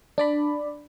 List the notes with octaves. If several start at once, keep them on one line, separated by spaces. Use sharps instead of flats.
D4 D5 B5